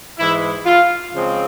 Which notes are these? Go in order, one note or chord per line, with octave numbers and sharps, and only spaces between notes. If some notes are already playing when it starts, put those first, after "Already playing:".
G#2 E3 G#3 E4
F4
C#3 F3 G#3 C4